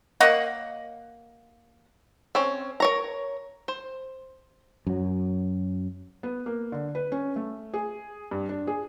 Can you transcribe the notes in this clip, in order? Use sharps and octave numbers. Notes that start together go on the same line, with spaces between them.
A#3 C#5 D#5 F#5
C4 C#4 C#5
A#4 C#5 A#5
C5
F#2 F#3
B3
A#3
D3
B4
C#4
A3
G#4
G2
D4
G#4